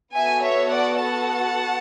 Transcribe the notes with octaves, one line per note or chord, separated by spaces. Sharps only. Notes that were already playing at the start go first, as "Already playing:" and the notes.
B3 F#4 A4 E5 G#5
C#5 E5
D5 F#5
F#5 A5